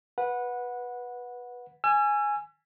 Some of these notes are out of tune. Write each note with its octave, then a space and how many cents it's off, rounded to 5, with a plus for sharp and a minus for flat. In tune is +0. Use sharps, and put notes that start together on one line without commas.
B4 -10 F#5 -15
G#5 +0 E6 +40